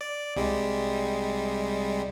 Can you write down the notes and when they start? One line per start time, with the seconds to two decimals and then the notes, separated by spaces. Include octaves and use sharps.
0.01 D5
0.36 C2 G3 G#3